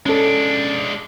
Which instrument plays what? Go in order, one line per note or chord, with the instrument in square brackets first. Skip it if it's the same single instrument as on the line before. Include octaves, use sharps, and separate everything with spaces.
[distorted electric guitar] G#3 D4 [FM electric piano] C#4 A4